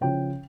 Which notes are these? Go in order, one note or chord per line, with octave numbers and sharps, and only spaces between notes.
C#3 F3 G5